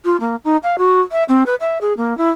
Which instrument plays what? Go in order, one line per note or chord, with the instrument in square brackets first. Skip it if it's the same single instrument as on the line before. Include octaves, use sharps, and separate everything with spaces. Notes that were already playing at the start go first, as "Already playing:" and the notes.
[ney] F4
A#3
D#4
F5
F#4
E5
C4
B4
E5
G#4
A#3
E4